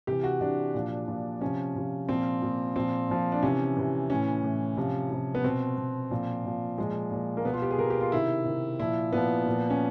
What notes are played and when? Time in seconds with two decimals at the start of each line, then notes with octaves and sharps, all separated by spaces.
0.07 C3 E3 G4
0.24 F#4
0.41 C3 E3 D4
0.74 A#2 F3
1.08 A#2 F3
1.41 C3 F3 C#4
1.76 C3 F3
2.09 A#2 F3 C4
2.42 A#2 F3
2.76 A#2 F3 C4
3.09 A#2 F3
3.32 D4
3.42 C3 E3 C#4
3.77 C3 E3
4.10 A2 E3 C#4
4.43 A2 E3
4.77 C3 F3
5.10 C3 F3
5.35 B3
5.44 B2 C4
5.78 B2
6.11 A#2 F3
6.45 A#2 F3
6.78 A#2 F3 G#3
7.11 A#2 F3
7.37 A#3
7.45 B2 B3
7.53 F4
7.62 G4
7.71 G#4
7.78 B2 A#4
7.90 G4
8.01 F4
8.12 C3 D#3 E4
8.45 C3 D#3
8.79 A#2 F3 E4
9.12 A#2 F3 B3
9.46 A#2 F3
9.70 C#4